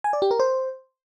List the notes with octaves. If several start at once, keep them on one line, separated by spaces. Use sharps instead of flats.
G#5
D5
G4
A#4
C5